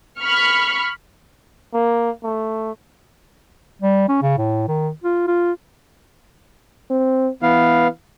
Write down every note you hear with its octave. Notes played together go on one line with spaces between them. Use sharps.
B5 C#6 F6
A#3
A3
G3
C#4
C#3
A2
D#3
F4
F4
C4
E3 B3 F5